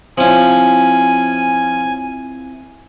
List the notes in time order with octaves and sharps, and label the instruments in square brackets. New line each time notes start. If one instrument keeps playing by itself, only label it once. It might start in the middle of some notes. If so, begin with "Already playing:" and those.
[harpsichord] F3 C#4 [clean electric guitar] C4 E4 F4 [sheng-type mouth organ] G#5